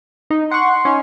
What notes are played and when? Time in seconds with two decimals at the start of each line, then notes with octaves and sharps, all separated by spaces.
0.30 D#4
0.51 F#5 C6 C#6
0.85 C#4 D#4